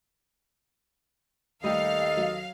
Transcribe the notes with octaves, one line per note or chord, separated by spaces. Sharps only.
D#2 G3 A3 G4 A4 D#5 F5
F#3